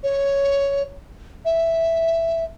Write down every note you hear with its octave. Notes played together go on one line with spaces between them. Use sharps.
C#5
E5